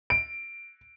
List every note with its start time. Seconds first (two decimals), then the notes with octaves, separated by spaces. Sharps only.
0.10 D7